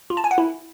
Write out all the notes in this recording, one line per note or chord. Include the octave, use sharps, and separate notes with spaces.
F4
A5
G#5
F#5
E4